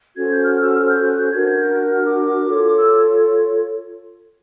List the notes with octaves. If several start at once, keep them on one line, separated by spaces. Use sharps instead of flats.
C#4 F#4 A4 C5 G#6
G6
F6
E6
F6
G6
F#6
G6
D4 F#4 A#4 G#6
G6
G6
F#6
F6
D6
F4 A4 C#5
E6